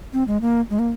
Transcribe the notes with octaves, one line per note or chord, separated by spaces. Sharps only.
C4
G#3
A#3
G#3
A#3